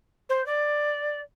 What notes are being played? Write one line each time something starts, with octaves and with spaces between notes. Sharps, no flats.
C5
D5